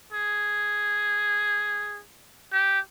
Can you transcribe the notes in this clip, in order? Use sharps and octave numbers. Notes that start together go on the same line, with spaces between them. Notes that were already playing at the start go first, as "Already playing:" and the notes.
G#4
G4